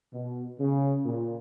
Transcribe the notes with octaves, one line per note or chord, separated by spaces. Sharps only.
B2
C#3
A#2